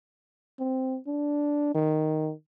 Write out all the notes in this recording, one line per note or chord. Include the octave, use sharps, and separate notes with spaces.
C4
D4
D#3